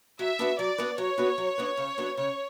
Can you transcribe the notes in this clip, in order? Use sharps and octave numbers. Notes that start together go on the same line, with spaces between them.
F#3 E5
B3 D4 F#4 B4
F#3 D5
B3 D4 F#4 B4
F#3 C#5
B3 D4 F#4 B4
F#3
B3 D4 F#4 B4
C#3
F#3 B3 D4
C#3 C#5